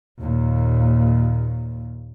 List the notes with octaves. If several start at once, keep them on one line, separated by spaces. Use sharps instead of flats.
D#2 A#2